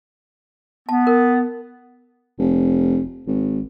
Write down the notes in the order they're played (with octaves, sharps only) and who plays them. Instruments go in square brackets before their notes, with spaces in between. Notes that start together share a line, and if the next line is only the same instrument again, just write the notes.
[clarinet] B3 [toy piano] A5
[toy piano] A#4
[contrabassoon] F1
G#1